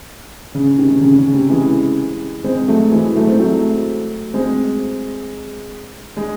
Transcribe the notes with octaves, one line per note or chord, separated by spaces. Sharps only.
C#3
C3 D#3
C3
C#3
C#3
C3
E3 G#3
G#3 C4
F#3 A3
E3 G#3
F#3 A3
C4
F#3 A3
G#3 C4
G#3